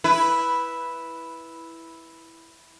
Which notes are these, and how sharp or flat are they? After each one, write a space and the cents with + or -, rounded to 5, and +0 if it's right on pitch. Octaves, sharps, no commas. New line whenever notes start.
E4 +0 B4 -5